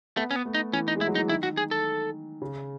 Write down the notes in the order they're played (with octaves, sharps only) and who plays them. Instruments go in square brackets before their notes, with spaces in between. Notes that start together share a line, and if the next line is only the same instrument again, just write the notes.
[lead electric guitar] A3 [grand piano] B3
[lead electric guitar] C#4
B3
[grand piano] A3
[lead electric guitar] D#4
[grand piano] E3 [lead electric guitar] C#4
[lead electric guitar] D#4
[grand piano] G#3
[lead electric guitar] E4
[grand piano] F#3
[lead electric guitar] D#4
[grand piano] E3
[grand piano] D#3 [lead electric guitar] E4
[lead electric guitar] F#4
G#4
A4
[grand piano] C#3